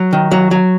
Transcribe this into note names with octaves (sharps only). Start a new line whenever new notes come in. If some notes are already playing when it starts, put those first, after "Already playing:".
Already playing: F#3
D#3
F#3
F#3